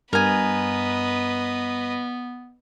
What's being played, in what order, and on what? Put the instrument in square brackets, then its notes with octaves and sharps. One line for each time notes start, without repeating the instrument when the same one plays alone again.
[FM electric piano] G2 [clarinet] B3 [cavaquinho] A#4 G#5 [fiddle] B4 D#5